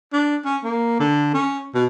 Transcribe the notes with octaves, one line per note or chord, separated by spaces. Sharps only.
D4
C#4
A#3
D3
C#4
B2